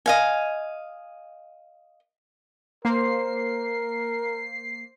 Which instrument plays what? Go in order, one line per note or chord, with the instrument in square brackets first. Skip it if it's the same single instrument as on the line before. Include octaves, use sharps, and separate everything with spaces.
[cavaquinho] D#5 F5 G#5
[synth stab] A#3 [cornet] A#4 [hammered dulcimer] C5 [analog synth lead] C7